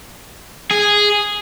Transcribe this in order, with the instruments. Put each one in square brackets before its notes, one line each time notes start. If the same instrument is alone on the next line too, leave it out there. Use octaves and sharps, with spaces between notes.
[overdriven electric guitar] G#4